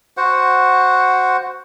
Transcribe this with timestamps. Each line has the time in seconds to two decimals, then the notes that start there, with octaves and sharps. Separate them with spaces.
0.17 F#4 C5 F#5